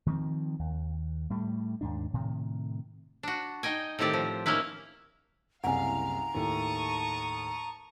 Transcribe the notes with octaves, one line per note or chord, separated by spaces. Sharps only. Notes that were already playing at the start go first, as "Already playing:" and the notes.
D#3 F3 A#3 C4
D#2
A2 G3 A3
D#2 G#2 D4
A2 C3 D#3
D4 F#4
D#4 D#5 G5 G#5
A2 D#3 C4 G4 D5
F3
A#3 C#4 D#4 E4 B4
F#1 C2 F5 F#5 G#5 A#5
D#2 A2 A5 C#6 D#6